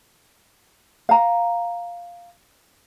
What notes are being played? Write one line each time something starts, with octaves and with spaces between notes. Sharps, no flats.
F5 A#5